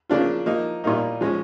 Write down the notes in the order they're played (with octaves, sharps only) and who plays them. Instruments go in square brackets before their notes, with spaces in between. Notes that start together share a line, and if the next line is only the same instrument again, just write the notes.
[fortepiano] C#3 F3 A#3 D4 F4
F3 A#3 D#4
A#2 G3 A#3 D#4
F3 G#3 C#4